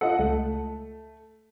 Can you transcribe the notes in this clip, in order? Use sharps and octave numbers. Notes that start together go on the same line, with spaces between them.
F4 A4 D#5 F#5
C#2 A3